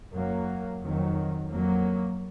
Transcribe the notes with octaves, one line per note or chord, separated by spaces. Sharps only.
F#2 F#3 A#3
F2 D#3 F#3
F2 F#3 A#3